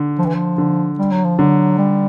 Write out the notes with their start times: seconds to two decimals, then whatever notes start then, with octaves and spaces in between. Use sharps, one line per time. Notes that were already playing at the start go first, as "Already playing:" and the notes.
Already playing: D3
0.19 F3
0.26 E3
0.35 F3
0.58 D3
0.99 G3
1.12 F#3
1.24 F3
1.39 D3 F#3
1.78 G3